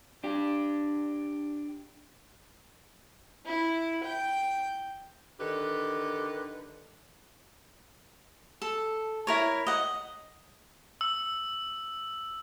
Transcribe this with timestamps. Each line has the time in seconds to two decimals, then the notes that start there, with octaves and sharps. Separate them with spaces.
0.24 D4 G4
3.46 E4
4.03 G5
5.40 D3 D#3 G4 A4 B4
8.62 A4
9.27 E4 A#4 C#5
9.67 D#5 F#5
11.01 E6